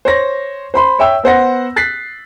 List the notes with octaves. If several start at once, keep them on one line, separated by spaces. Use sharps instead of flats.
C5 C#5 A#6
C5 B5 C6
C#5 E5 G5 E6
B3 C5 F#5 A#6
F#6 A6 B6 C7